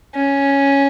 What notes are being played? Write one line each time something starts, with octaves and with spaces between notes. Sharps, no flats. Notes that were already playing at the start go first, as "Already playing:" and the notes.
C#4